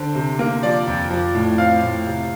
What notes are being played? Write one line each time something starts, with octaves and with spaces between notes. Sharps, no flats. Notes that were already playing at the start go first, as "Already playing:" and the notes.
Already playing: D3 D4 C5
C3
A#3
F3 D5
F2
F3
A2
C4 F5
A2
C3